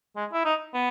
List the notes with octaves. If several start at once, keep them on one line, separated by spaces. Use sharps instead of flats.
G#3
E4
D#4
B3